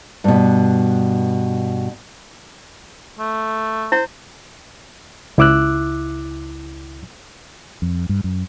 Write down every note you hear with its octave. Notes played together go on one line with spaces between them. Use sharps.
G2 B2
A3
E4 C5
C#2 E4 D6 E6 F#6
F2
G2
F#2